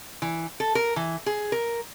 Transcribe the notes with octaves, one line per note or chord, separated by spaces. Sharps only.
E3
A4
A#4
E3
G#4
A#4